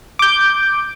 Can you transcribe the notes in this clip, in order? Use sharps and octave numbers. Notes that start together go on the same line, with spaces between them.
D6 G6